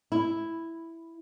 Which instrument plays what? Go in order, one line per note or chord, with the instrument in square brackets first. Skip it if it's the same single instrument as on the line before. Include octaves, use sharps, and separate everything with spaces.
[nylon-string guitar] E4